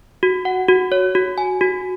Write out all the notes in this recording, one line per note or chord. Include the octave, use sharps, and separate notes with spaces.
F#4
F#5
F#4
C#5
F#4
G#5
F#4